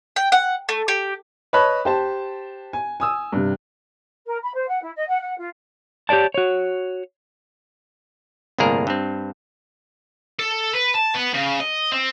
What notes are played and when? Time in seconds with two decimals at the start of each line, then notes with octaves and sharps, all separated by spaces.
0.16 G5
0.32 F#5
0.69 A3
0.88 G4
1.53 B4 C#5 D#5 A5 B5 F#6
1.85 G4 C5 A5
2.73 G#5
3.00 G#5 D#6 E6
3.32 G2 C3
4.27 A#4
4.42 B5
4.54 C5
4.67 F#5
4.82 E4
4.96 D#5
5.09 F#5
5.22 F#5
5.38 F4
6.09 G4 G#4 C#5 D5 A5
6.34 F#4 C#5
8.58 G1 C2 A2 A#3 G#4 A#4
8.87 G2 C4
10.39 A4
10.73 B4
10.94 A5
11.14 B3
11.34 C#3
11.60 D#5
11.92 C4